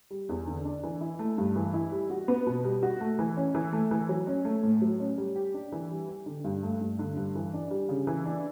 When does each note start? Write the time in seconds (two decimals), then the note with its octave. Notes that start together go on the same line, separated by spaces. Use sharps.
0.10 G3
0.29 E2
0.47 D3
0.65 D4
0.83 E3
1.01 E4
1.19 A3
1.38 G2
1.56 E3
1.74 E4
1.92 G3
2.10 F#4
2.28 B3
2.47 B2
2.64 G3
2.83 F#4
3.01 A3
3.19 E3
3.37 C#4
3.55 E3
3.73 A3
3.91 E3
4.09 F#3
4.27 C#4
4.45 A3
4.63 A2
4.82 F#3
5.00 C#4
5.18 G3
5.36 G4
5.54 D4
5.72 E3
5.91 G3
6.08 G4
6.26 D3
6.44 G2
6.63 A3
6.81 G2
6.99 D3
7.16 G2
7.35 E3
7.54 D4
7.71 G3
7.89 C#3
8.07 E3
8.26 D4